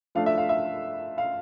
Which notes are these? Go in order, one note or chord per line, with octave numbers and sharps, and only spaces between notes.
F3 A3 D4 F5
E5
F5
E5
F5